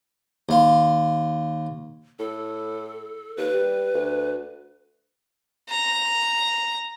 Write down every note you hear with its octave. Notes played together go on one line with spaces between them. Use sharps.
D#2 F5 C6
A2 A4
D#2 B4
G3
D2
A#5